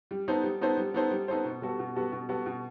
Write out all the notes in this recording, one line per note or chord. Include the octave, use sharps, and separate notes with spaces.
G3
B3 D#4 A4 C5
G3
B3 D#4 A4 C5
G3
B3 D#4 A4 C5
G3
B3 D#4 A4 C5
B2
G3 B3 F#4 A4
B2
G3 B3 F#4 A4
B2
G3 B3 F#4 A4
B2